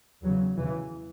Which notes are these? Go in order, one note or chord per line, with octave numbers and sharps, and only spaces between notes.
E2 C#3 F#3
E2 C#3 E3